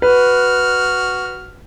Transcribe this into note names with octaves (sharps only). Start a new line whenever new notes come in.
F#4 B4 F6